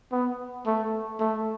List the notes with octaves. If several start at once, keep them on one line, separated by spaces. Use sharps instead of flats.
B3
A3
A3